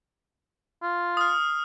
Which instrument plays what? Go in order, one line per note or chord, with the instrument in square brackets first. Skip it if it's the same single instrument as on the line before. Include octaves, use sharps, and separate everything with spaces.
[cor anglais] F4
[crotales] D#6 F6